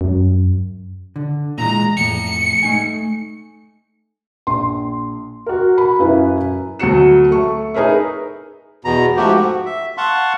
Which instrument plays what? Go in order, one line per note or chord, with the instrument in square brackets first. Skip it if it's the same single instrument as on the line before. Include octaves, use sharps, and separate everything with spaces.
[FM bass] F#2
[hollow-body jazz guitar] D3
[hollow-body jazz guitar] A#2 E3 G#3 [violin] A#5
[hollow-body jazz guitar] F2 A2 [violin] C#7
[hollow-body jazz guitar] A3 D#4 G#5
[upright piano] A#1 [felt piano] C6
[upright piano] F#4 A#4
[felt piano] B5
[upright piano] F#2 [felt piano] E4 B4 F5
[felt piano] D2 F#3 F#4 C#7 E7
A3 C#6
D#4 G#4 A#4 B4 E5
[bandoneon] E2 B2 A#5
G#2 F3 A3 F#4 G4
F#4
E5
F5 F#5 A5 C6 C#6